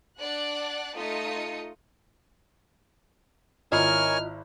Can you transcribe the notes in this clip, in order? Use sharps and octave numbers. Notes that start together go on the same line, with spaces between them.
D4 D5 F#5 F#6
A3 D#4 F4 D#6 C#7
G#1 E4 F4 A#4 C#5 D#5 G#5 F6